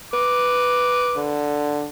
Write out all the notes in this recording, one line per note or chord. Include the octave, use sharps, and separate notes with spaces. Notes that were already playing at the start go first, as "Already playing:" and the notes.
B4 D6
D3